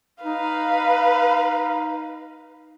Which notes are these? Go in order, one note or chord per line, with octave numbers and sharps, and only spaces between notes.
D#4 B4 F5